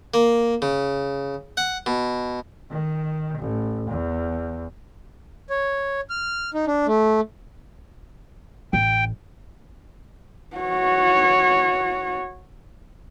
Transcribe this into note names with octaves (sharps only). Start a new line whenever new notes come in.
A#3
C#3
F#5
B2
D#3
A1
E2
C#5
F6
D#4
D4
A3
A1 G5
F#4 C#5